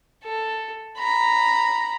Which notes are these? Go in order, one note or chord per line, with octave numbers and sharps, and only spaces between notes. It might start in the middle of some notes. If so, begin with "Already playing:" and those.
A4
A#5 B5